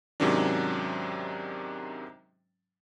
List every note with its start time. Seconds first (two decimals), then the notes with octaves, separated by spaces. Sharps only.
0.20 G#2 C3 D#3 F#3 C#4 D4